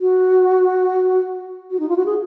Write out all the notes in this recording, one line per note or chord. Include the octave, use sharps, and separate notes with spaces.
F#4
F#4
D#4
F4
F#4
G#4